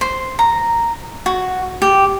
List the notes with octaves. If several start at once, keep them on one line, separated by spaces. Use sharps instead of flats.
C5
A#5
F#4
G4